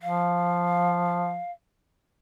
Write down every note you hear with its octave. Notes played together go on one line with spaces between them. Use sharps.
F3 F5